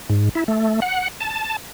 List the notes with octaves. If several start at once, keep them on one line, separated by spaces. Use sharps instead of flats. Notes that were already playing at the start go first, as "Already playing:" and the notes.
G#2
E4
A3
F#5
A5